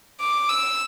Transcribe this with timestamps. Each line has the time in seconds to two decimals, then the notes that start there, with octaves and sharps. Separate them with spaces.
0.20 D6
0.49 E6